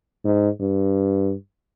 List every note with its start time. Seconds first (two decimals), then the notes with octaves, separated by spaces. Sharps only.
0.25 G#2
0.60 G2